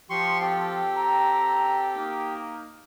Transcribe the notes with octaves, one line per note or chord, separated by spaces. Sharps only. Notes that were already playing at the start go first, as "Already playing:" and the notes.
F3 G4 C6 C#6
C4 G4 A4
A#5
A#3 D#4